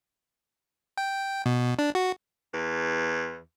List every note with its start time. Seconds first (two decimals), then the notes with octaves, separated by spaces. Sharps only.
0.98 G5
1.46 B2
1.79 D4
1.95 F#4
2.53 E2